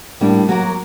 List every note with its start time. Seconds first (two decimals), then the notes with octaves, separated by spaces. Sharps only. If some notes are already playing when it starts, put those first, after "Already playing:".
0.21 A2 G3 A#3 D4
0.49 F#3 A#3 F#4 A#4